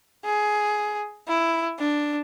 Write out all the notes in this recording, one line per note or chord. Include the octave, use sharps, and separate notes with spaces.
G#4
E4
D4